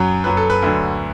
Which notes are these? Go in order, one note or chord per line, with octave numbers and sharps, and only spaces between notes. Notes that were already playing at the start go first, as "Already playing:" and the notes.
Already playing: F#2 F#3
F#2 F#3 B4
A4
B4
D2 D3 F#3